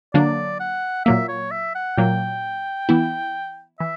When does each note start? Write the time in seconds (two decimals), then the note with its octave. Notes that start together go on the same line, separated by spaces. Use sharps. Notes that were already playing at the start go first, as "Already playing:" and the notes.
0.14 D3 F#3 A#3 D4 D5
0.60 F#5
1.05 A#2 F#3 A#3 E5
1.28 C#5
1.51 E5
1.75 F#5
1.97 A#2 F#3 A#3 G5
2.89 E3 B3 E4
3.80 E3 E5